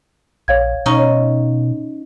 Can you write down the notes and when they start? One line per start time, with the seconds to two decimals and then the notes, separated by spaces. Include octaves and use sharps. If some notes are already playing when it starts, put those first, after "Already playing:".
0.48 A#1 C#5 F5 G#6
0.86 B2 C#4 D#4